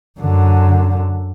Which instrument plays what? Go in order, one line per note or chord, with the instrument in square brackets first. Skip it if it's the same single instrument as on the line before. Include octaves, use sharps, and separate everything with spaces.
[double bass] F#2 D3